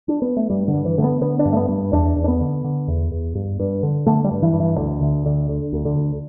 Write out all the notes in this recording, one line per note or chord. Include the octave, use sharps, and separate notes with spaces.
D4
B3
A3
G2 G3
D3
G2
E3
D3 A3
B3
D3 B3
D4
G2
A3
B3
G2
E2 D4
E2
D4
B3
D3
D3
E2
E2
G2
G2
D3
D3 A3
G3
G2
E3
G2
E3
D2 D3
D2
D3
D3
D2
D3
D2